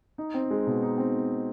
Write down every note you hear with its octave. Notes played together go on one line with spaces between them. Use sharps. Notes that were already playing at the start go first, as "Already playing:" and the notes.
D#4
C4
G#3
B2
D#4
C4